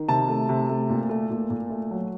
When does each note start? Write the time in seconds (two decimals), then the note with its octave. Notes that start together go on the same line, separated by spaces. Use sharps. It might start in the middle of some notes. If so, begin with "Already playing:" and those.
Already playing: D#3
0.08 C3 A5
0.28 A3
0.49 C3
0.69 A3
0.89 A#2
1.09 A3
1.30 A#2
1.50 A#2
1.70 A3
1.91 F#3